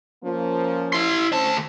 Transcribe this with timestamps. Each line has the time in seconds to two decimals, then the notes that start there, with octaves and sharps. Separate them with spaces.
0.23 F3 A#3 C#4
0.93 E4 C6
1.32 D2 C4 C#4 C5 A5